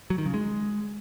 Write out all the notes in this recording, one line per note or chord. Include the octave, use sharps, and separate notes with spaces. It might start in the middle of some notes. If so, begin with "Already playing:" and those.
F#3
D#3
C#3
G#3